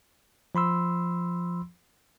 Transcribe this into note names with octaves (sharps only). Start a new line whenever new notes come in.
F3 B5 C6 E6